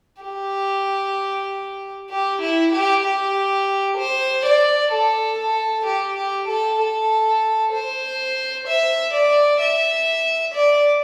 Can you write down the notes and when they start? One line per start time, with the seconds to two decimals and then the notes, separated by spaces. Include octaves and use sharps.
0.22 G4
2.10 G4
2.42 E4
2.72 G4
3.04 G4
3.98 C5
4.45 D5
4.92 A4
5.39 A4
5.86 G4
6.17 G4
6.48 A4
6.79 A4
7.73 C5
8.67 E5
9.14 D5
9.60 E5
10.55 D5